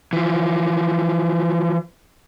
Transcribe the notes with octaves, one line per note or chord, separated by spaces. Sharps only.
E3 F3